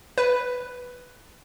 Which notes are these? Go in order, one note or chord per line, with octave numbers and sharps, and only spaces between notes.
B4